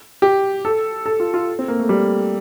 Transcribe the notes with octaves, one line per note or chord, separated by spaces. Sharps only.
G4
A4
A4
F4
F4
C4
A#3
A3
G3